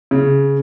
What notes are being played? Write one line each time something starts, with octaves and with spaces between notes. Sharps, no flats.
C#3